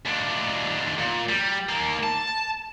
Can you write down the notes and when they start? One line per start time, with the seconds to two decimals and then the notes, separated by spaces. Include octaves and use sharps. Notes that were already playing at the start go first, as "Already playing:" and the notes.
0.06 D#2 D4
0.98 A#2
1.29 G3
1.69 D#2 A#3
2.03 A5